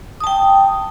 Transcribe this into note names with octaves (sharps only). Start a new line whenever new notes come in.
G5 A5 D#6